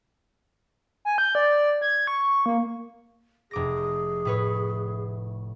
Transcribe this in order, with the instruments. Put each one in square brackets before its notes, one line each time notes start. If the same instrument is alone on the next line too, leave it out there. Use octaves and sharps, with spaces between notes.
[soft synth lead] G#5
G6
D5
G#6
C#6
A#3
[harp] F1 D6 A#6 [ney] G#4
[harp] A2 B4 C#5